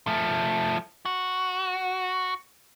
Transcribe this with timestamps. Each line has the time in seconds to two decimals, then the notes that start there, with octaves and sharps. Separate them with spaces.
0.07 F3 A3
1.06 F#4